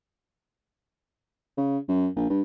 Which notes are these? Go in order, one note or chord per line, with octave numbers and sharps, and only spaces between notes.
C#3
F#2
A#1
G2